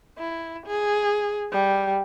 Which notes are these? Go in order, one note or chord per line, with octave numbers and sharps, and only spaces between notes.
E4
G#4
G3